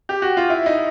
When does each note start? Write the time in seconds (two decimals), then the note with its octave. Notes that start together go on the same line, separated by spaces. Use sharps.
0.09 G4
0.22 F#4
0.37 F4
0.50 E4
0.66 D#4